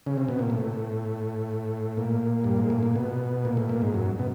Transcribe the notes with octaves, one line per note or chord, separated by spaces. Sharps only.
C#3
C3
B2
A#2
A2
A#2
G2
G#2
A2
A#2
B2
A#2
A2
A#2
G#2
F#2
B2